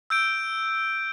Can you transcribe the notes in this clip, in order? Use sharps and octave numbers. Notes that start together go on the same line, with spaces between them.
E6 G6 D7